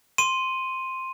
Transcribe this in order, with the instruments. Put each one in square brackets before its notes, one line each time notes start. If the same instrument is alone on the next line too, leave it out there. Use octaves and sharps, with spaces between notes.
[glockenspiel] C6 D#7